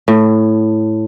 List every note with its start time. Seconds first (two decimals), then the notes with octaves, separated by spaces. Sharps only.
0.08 A2